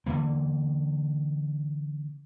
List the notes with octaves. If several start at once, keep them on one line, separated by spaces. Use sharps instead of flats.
D3 E3 A#3